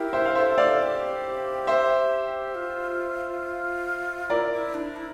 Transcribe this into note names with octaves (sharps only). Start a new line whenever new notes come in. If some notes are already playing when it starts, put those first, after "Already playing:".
Already playing: E4 G4 A#4
C5 E5
F5
A4 C5 E5
D5 F5
A4
G4
C5 E5
F4
E4 A#4 D5
E4
D4
E4